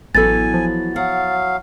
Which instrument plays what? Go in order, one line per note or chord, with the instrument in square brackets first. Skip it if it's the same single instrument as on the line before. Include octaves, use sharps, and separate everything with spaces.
[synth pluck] A1 A4 [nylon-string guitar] E3 F#3 B3 [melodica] G#5 [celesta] A6
[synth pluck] F3
[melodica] F#3 F5 [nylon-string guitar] F#5